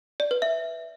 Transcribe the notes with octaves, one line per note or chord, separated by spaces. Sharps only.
D5
B4
E5